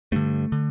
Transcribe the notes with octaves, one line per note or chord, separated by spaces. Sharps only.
G2 D3 A3
D3